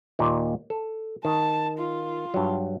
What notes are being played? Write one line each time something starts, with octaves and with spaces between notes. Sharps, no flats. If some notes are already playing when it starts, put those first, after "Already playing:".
D#2 A#2 D5
A4
D#3 A5
F4
G2 F#3